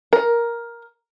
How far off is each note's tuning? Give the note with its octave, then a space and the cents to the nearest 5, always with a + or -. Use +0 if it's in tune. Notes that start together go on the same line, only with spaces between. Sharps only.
A#4 +10